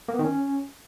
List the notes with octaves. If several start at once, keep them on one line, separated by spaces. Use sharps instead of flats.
A#3
B3
D#3
C#4